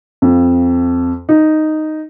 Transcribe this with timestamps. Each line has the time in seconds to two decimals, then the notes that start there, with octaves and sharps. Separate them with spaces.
0.22 F2
1.29 D#4